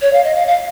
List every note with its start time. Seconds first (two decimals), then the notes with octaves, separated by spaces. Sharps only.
0.02 C#5
0.13 F5
0.24 D#5
0.35 F5
0.47 F5